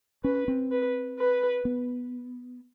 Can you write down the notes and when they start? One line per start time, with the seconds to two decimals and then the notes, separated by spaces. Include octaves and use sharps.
0.24 C#4 B4
0.48 C4
0.71 B4
1.19 B4
1.65 B3